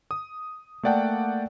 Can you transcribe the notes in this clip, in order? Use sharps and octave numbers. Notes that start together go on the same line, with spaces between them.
D#6
A3 A#3 D5 F#5 G5 A5